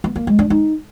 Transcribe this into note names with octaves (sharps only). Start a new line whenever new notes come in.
B3
A#3
G#3
D4
D#4